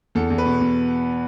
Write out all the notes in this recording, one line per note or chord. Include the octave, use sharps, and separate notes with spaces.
E2 A4
E2
B4
B2
B2